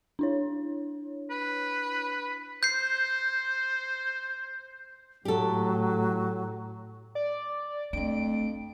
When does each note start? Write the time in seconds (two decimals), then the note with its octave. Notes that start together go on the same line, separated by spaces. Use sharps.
0.19 D4 E4 C#5
1.30 B4
2.63 C5 G6 C7
5.25 A2 F#3 G4 A4
7.15 D5
7.93 F2 A3 D4 D7